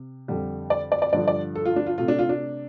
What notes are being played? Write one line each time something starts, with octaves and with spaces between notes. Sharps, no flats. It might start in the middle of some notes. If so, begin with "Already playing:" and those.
Already playing: C3
F2 D3 G3
D5
D5
D5
G2 D3 F3 D5
D5
A4
F4
D4
F4
C3 A3 F4
D4
F4
D4